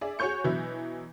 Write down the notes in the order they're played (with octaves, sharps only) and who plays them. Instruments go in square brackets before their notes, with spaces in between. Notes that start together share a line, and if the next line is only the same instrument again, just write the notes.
[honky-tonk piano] G#4 D5 E5
F#4 G#4 C#5 C#6 G6 C#7
B2 E3 F#3 E4